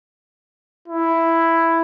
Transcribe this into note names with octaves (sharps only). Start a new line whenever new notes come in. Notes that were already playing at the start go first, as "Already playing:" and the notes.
E4